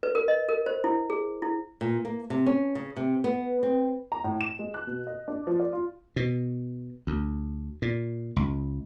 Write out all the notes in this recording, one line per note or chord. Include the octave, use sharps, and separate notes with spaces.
B4
A#4
D#5
A#4
C5
E4
G#4
E4
A#2
A#3
C3
C#4
C#3
C3
B3
C4
A#5
A2
E7
G#3
F#6
B2
D#5
D4
F3
D5
F4
B2
D2
A#2
C#2